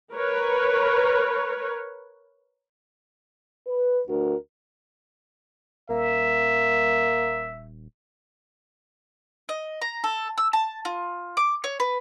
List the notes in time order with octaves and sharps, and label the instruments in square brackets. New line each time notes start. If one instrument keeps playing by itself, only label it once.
[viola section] A#4 B4 C#5
[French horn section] B4
D2 D3 F#4 A#4
[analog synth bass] D#1 [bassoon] A#3 [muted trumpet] E5
[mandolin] D#5
A#5
A4
E6
A5
F4
D6
C#5
B4